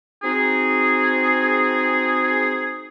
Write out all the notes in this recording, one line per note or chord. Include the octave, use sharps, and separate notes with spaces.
C4 D#4 F#4 G#4